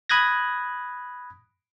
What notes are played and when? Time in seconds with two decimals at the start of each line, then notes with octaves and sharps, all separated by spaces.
0.09 B5 D#6 F#6 G#6 A#6